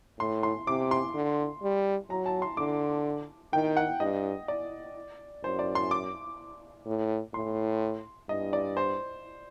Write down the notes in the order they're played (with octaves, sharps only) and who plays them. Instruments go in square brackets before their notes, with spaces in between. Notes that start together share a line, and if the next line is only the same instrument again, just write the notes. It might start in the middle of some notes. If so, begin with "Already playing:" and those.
[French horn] A2 [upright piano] C6
[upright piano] C6
[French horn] C3 [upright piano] D6
[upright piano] C6
[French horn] D3
G3
[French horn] F#3 [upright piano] A#5
[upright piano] A5
C6
[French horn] D3 [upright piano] D6
[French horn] D#3 [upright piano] G5
[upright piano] F#5
[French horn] G2 [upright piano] D#5
[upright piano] D5
[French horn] F#2 [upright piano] C5
[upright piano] D5
C6
D6
[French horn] A2
[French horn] A2 [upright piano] C6
[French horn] G2 [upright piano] D#5
[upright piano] D5
C5